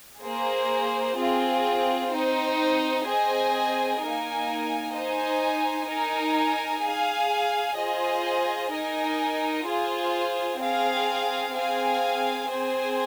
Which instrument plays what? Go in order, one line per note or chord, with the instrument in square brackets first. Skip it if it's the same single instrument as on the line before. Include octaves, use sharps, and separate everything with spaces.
[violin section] A#3 G#4 C5
C4 F4 G#4
C4 D#4 C5
C4 G#4 C5 D#5 G#5
A#3 D#4 A#4 G#5
D#4 C5 D#5 G#5
D#4 A#4 G#5
G#4 F5 G#5
F4 G#4 C5 D#5 G#5
D#4 A#4 D#5 G#5
F4 G#4 C5
C4 G#4 F5
C4 G#4 F5 G#5
C4 G#4 C5 G#5